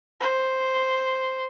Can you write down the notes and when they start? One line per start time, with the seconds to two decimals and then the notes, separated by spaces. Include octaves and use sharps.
0.20 C5